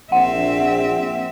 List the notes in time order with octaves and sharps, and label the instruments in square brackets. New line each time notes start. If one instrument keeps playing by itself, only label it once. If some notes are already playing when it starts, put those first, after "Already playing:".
[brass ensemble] A#1 [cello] C4 E5 [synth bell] F#5